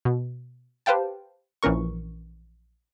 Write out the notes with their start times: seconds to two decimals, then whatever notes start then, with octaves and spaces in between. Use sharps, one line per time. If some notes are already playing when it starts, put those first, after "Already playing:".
0.05 B2
0.86 G4 B4 C5 F5 G5 A5
1.63 A#1 E3 C#4 A#4 C#6